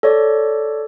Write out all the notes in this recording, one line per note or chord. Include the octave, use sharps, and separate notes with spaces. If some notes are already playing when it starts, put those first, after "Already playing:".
A4 C#5 D5